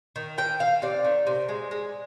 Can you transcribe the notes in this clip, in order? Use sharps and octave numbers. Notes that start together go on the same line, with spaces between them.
D#3
D#3 G5
D#3 F5
C3 D5
D#3
C3
G#3
G#3